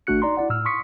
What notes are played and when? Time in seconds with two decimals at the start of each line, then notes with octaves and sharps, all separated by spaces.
0.07 G#1 A3 D4 F#4 F#6 C#7
0.22 D#4 D5 A#5 C6
0.37 E4 D5 F#5
0.50 A2 E6 F6
0.65 C6 C#6 D#6 B6 C#7